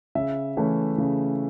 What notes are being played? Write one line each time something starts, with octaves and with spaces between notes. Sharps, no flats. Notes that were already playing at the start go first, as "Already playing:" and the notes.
C#3 E5
E3 A3 C#4
C#3